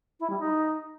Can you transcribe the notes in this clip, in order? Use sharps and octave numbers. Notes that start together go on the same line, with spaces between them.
E4
G3
D#4